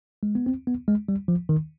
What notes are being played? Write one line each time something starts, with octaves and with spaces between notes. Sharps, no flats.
G#3
B3
C4
B3
G#3
G3
F3
D#3